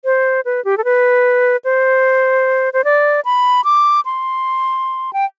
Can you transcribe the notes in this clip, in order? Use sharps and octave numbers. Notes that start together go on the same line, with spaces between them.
C5
B4
G4
A4
B4
C5
C5
D5
B5
D6
C6
G5